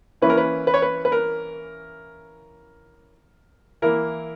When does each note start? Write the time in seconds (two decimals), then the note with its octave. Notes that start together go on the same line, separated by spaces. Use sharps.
0.22 E3 A#3 C#4 E4 B4
0.30 A#4
0.37 B4
0.67 B4
0.74 C#5
0.82 B4
1.05 B4
1.12 A#4
3.82 E3 A#3 E4 A#4